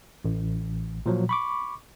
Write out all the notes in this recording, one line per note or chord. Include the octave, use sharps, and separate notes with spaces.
A1
A#2 F3 F#3
B5 C#6 D6